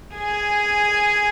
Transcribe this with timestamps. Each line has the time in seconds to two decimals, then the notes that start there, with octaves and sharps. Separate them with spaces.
0.16 G#4 G#5